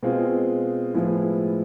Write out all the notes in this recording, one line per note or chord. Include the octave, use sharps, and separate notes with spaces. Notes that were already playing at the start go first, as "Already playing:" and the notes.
B2 G#3 C4 F4
A2 F3 G#3 B3 E4